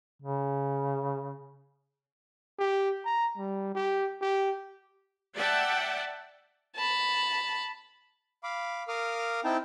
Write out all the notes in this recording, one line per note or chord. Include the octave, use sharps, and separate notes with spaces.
C#3
G4
A#5
G3
G4
G4
D5 E5 F#5 G5 A5
A5 B5
F5 B5 D6
A#4 F5 D6 D#6 F6
C4 D#4 E4 G5 A5